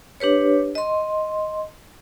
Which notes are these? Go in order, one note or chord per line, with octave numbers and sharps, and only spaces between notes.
D4 G4 B4 C#5
D#5 C6